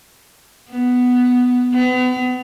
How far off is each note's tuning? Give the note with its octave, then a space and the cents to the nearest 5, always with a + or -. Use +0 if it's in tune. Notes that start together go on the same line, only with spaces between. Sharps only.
B3 +5
B3 +35